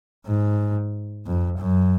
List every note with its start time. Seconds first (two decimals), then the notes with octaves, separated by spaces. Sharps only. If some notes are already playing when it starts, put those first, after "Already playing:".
0.27 G#2
1.26 F2
1.58 F#2